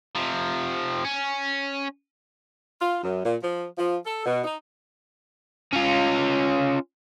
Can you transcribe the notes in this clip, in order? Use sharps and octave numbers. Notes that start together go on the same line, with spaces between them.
C3 F3
C#4
F4
F#2
A#2
F3
F3
A4
B2
D#4
C#4 F4